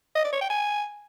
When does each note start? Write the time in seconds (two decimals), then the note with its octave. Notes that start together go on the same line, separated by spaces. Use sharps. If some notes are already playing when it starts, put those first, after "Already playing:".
0.15 D#5
0.24 D5
0.33 C#5
0.41 G5
0.50 G#5